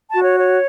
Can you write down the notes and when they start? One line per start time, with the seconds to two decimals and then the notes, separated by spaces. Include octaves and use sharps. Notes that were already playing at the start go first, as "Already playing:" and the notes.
0.09 A5
0.15 F#4
0.23 C#5
0.38 C#5